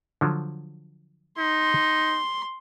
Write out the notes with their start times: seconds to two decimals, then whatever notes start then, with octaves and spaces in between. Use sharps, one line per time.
0.21 D3 F3 F#3
1.38 D#4 C6